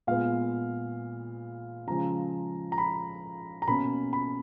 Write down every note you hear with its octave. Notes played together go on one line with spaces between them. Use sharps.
A#2 G#3 B3 F5
C#3 F3 G#3 A#5
A#5
B5
A#5
B2 A#3 C#4 B5
B5